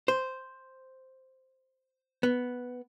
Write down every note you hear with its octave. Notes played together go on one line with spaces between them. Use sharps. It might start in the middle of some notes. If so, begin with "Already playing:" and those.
C5
B3